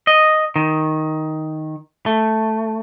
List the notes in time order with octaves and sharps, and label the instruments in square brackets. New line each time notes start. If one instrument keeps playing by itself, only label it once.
[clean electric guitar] D#5
D#3
A3